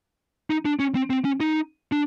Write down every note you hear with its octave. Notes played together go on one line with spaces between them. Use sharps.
D#4
D4
C#4
C4
C4
C#4
D#4
D4